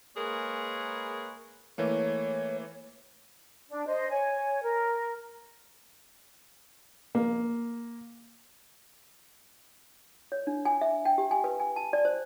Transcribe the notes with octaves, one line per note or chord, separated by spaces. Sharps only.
G#3 A#3 G#4 A#4 B4 C#5
E3 A3 A#3 C#5
D4
C5 D#5
C#5 G#5
A#4
A#3
C#5
D4
G#5
E5
G5
G4
G#5
B4
G#5
A5
D5
C5